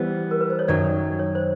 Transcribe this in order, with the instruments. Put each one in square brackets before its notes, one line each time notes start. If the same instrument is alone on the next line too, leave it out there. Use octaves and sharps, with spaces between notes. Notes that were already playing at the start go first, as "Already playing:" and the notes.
Already playing: [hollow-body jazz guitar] E3 G3 B3 [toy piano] C5
[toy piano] A#4
B4
C5
C#5
[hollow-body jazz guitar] F#2 D#3 F#3 [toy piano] D5
[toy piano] C#5
C5